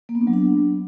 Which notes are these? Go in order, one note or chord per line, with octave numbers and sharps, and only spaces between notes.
A#3
B3
D4
F#3
D4